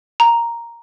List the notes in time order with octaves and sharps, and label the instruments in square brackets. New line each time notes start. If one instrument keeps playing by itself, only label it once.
[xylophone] A#5